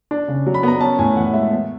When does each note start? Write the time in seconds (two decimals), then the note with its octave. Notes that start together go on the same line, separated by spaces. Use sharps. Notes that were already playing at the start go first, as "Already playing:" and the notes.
0.11 D4
0.28 C#3
0.46 F#3
0.54 B5
0.63 B3 A#5
0.81 C#4 A5
0.99 A2 G#5
1.16 E3 F#5
1.33 G#3 E5
1.52 B3